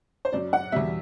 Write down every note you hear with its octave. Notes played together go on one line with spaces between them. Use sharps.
C5
F#2 F#3 D5
F#5
E2 B2 G3 E5